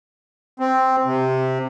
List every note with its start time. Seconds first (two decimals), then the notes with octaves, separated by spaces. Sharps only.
0.60 C4
1.05 C3